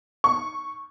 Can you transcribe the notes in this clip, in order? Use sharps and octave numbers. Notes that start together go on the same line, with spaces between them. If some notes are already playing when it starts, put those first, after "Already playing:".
C#6